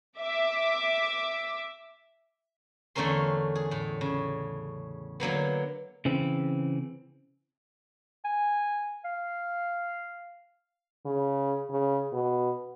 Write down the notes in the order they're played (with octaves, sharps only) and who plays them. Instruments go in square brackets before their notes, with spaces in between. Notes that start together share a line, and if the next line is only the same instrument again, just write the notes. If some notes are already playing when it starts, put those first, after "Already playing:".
[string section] E5 D6
[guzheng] E2 D3 A3 C#4 A#4 C6
G#4
A2
C#3
D3 F#3 A#3 B3
[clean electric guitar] C#3 E3 C4
[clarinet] G#5
F5
[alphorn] C#3
C#3
B2